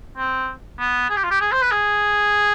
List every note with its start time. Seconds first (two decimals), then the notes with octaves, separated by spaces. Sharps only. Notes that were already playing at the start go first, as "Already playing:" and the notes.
0.17 C4
0.79 B3
1.10 G#4
1.17 G4
1.24 F4
1.31 G4
1.41 G#4
1.52 C5
1.62 B4
1.71 G#4